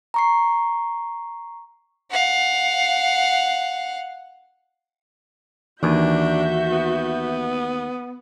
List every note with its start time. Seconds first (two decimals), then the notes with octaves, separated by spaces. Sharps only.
0.14 A#5 C#6 C7
2.10 F5 F#5
5.83 D#2 E3 D4 F#4 E5 G6
6.72 B3